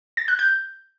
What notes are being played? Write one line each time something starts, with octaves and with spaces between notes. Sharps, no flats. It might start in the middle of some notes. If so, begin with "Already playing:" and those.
A6
F#6
G6